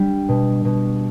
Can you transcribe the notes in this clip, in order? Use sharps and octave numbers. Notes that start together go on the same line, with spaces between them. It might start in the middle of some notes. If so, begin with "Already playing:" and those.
Already playing: G3 D4
B2
B2